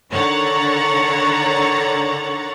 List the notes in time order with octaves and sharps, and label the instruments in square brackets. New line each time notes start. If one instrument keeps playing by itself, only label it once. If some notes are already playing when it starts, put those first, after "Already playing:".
[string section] D3 D#3 C#5 F#5 A#5 A6